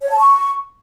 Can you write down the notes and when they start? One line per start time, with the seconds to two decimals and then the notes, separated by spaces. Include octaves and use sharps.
0.01 C#5
0.11 A5
0.20 C#6